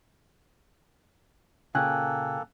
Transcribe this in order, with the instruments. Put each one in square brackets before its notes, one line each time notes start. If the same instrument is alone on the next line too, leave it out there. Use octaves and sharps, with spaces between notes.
[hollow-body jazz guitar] A#2 C#3 [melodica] A#3 A4 [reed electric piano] G5 G#5 F#6